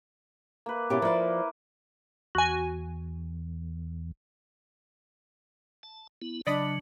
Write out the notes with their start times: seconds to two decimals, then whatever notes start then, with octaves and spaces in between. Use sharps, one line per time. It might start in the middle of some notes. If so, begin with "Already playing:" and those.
0.66 A#3 B4
0.90 B2 C#4 E4 G4 D5 D6
1.02 F3 A#3 B4 D5
2.35 E2 F#4 G#5
5.83 A5
6.22 B3 E4
6.47 C#3 F#3 D4 D5 D#5 B5